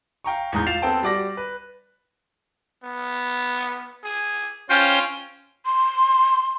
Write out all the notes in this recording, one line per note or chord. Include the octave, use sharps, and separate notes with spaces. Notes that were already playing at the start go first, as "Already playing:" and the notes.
F5 G5 A#5 C#6
E2 G#2 G6
F4 F5 A6 C7 E7 F7
B3 C4 A4 C5 G5 A5
G3 F#4 D5 D6 A#6
B4
B3
G#4
C#4 F4 C5 G5
C6